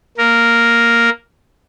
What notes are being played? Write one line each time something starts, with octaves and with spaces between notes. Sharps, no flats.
A#3 A#4